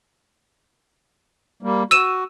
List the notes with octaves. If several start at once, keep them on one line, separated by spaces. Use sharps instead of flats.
G3 A#3
F#4 E6 D#7 E7